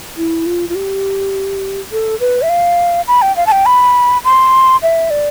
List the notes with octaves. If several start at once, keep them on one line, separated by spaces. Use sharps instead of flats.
E4
F4
F4
G4
A4
B4
E5
F5
B5
G5
F5
A5
G5
B5
C6
E5
D5